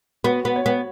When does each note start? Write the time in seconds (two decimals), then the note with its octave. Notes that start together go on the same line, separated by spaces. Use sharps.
0.24 B3 F#4
0.45 B3
0.56 C#5
0.66 B3